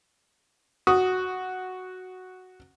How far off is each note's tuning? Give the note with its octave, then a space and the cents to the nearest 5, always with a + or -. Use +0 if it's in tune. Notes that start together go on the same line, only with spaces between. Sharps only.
F#4 +0 D#6 +0